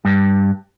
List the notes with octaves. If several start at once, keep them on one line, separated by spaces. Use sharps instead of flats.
G2